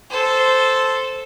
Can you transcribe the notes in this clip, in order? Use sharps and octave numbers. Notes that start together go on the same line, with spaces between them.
A4 C5